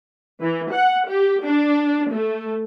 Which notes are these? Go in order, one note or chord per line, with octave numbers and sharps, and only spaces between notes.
E3
F#5
G4
D4
A3